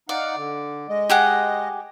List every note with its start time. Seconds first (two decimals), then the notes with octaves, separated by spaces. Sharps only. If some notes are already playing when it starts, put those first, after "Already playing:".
0.09 D#4 D5 F5 F#5
0.36 D3
0.89 G#3 D#5
1.09 G4 G#4 F#5